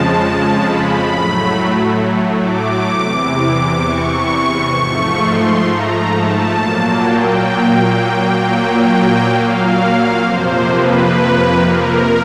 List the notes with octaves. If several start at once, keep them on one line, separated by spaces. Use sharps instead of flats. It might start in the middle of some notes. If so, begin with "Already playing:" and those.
Already playing: F2 C#3 F3 G#3 A5
B5
A2 F#3 A3
D6
E2 C3 E3
C#6
G#2 F3 A3
C6
A#5
A5
A#2 F#3 A#3
G5
A#2 F#3 A#3
G5
F5
F2 C3 F3 A#3 C5
B4
A#4